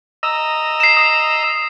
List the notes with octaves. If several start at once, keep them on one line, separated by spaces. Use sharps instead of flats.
D#5 A#5 E6
C7 E7
D#6 C7